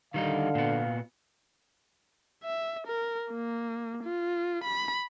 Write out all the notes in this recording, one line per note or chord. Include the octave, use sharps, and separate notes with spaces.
D3 D#3 G3 D#4 F5
A#2 B3
E5
A#4
A#3
F4
B5